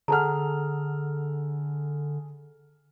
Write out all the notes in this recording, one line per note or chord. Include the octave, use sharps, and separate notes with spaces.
D3 G#4 A4 F#5 A5 A#5 F6